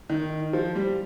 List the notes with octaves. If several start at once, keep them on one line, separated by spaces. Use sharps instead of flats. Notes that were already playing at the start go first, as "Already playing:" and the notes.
D#3
F3
G3